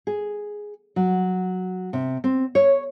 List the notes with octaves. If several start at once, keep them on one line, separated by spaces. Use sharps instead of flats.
G#4
F#3
C3
C4
C#5